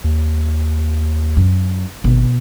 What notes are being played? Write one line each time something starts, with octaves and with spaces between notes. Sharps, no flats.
D#2
F#2
G#1 B2